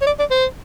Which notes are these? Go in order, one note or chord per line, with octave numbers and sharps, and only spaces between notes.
C#5
D5
D5
C5